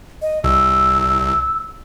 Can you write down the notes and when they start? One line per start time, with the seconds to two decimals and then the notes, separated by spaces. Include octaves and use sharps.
0.22 D#5
0.44 C2 E6